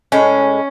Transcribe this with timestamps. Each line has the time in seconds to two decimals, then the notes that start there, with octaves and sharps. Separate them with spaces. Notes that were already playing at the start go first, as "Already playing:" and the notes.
0.12 A2 G#3 C#4